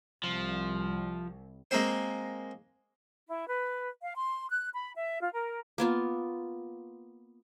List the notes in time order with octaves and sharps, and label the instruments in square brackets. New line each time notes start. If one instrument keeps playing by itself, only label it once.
[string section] C2 [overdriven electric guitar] F3
[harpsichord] G#3 A#3 C4 C5
[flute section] E4
B4
F5
C6
F#6
B5
E5
F4
A#4
[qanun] A#3 B3 F4